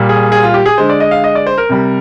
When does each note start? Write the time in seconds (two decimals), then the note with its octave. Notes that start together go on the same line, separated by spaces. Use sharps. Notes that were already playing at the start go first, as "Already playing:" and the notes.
Already playing: A#2 G3
0.09 G#4
0.32 G#4
0.43 F4
0.54 G4
0.66 G#4
0.78 D3 G#3 C5
0.89 D5
1.00 D#5
1.11 F5
1.24 D#5
1.35 D5
1.47 C5
1.58 A#4
1.69 C3 G3